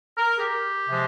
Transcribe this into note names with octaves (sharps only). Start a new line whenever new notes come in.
A#4
G#4
G4
C3 F3 G#3